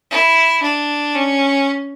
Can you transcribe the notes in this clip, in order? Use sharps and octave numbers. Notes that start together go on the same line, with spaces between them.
E4
D4
C#4